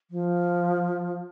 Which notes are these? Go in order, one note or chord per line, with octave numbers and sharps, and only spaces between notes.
F3